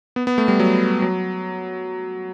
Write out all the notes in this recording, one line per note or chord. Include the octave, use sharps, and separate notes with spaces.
B3
B3
A3
G3
F#3
F#3